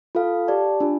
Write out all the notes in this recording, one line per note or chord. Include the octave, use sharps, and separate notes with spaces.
F4 A4 F5
G4 D5 A5
D4 F4